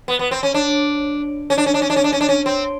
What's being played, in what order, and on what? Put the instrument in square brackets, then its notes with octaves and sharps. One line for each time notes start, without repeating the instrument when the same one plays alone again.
[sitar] B3
B3
C4
C#4
D4
C#4
D4
C#4
D4
C#4
D4
C#4
D4
C#4
D4
C#4
C4